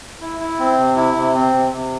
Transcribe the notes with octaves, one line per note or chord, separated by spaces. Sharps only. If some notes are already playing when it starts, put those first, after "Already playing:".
E4
E4
C4
C3
E4
C3
C4
C3
C3